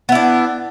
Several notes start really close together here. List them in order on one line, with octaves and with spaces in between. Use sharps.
B3 E4 D4